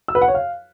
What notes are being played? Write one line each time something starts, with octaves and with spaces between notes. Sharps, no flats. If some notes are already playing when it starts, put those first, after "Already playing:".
E6
B4
F#5
C#5
F5